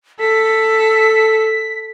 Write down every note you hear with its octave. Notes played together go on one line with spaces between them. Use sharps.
A4 B6